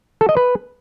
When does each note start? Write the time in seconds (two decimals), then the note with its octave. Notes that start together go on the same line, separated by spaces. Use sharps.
0.21 A4
0.29 D#5
0.37 B4